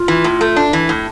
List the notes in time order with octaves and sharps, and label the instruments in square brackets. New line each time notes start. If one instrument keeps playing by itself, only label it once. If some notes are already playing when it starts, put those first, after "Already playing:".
Already playing: [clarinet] F4
[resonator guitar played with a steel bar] E3
A2
A3
D4
E3
A2